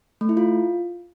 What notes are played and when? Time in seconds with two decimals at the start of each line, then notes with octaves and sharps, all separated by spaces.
0.21 A3
0.29 E4
0.37 F4